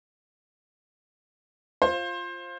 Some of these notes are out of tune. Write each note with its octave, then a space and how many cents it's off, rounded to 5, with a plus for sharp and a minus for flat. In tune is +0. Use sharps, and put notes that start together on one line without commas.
F4 +0 C5 +20